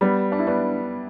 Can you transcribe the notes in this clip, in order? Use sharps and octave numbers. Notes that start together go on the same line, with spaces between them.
G3 B3
D4
E4
B3 D4